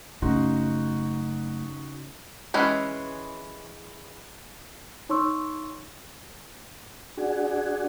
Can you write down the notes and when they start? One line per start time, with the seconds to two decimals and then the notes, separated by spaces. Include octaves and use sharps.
0.22 F#1 F#2 C#3 A3 D#4 F#4 C6
2.54 E3 G#3 C#4 B4
5.09 D#4 C#5 C6 C#6 E6
7.17 D4 F#4 G#4